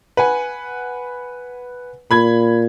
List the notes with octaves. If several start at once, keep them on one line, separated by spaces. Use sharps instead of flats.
B4 F#5 G#5
A#2 B5 G#6